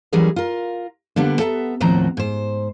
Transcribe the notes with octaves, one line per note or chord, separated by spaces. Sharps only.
E3 F#3 G3 C#4 G#4 A#4
F4 A#4
D3 G3 A#3 B3 D4
B3 A4 E5 G5 A#5
D#2 A2 F3 C4 F#4 A#5
G#2 C5